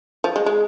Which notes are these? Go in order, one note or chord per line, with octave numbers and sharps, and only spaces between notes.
F3
G#3
G#3